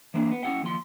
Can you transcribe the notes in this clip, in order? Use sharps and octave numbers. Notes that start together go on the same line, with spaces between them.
E3 A#3 C4 D4
B3
C#4 D#4 E4 F#5 G5
D#2 F3 C6